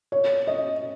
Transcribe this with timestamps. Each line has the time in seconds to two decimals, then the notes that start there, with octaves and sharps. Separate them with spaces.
0.12 C#5
0.47 D#5